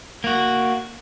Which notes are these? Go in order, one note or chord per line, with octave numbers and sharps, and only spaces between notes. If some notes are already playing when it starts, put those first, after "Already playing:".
A#3 F#4